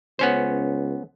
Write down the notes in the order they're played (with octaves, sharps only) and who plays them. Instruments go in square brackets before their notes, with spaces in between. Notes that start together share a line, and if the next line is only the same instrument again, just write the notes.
[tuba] C#2 [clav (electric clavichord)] B3 C#4 C5